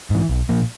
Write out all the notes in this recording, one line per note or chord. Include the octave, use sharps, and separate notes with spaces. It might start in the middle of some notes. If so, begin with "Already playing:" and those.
G#2 E3
B1
A#2 F3 A#3